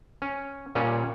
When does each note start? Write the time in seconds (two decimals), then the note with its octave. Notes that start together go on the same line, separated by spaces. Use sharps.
0.22 C#4
0.75 A#2 G3 C#4